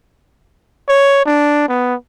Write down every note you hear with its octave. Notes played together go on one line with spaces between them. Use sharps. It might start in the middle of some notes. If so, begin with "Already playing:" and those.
C#5
D4
B3